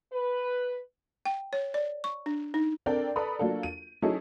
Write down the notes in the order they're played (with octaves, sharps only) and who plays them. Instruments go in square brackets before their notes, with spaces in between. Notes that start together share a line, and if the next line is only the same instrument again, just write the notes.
[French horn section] B4
[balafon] G5
C#5
D5
C#6
D4
D#4
[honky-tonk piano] C4 D4 A4 A#4 D5 G5
A4 B4 D5 A#5 B5 D#6
F#3 A#3 D4 F4 A4
D#7
F#3 C#4 D#4 E4 G#4 A4